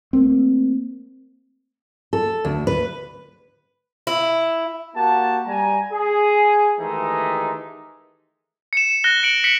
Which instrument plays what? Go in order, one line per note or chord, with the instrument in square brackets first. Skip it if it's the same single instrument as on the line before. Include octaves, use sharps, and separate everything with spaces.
[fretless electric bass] A3 A#3 C4
[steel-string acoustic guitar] A4
D2
B4
[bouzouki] E4
[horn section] A#3 F#4 G4 A5
G3 G#5 A#5
G#4
D#3 E3 G#3 A3 D#4 G4
[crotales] C#7 E7
F#6 A#6 G7
C#7 D7 F#7
B6 C#7 D7 F#7 G7